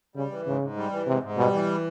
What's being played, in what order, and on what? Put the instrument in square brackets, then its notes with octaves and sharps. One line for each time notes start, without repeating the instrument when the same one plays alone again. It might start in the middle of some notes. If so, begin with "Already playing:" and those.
[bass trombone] C#3 [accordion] G3
[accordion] E3
[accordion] G#2 [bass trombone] C#3
[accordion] G#2
G3
E3
[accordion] G#2 [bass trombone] C3
[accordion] G#2
[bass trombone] B2 [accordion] G3
[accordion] E3